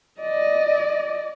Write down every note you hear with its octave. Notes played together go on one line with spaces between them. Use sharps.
D5 D#5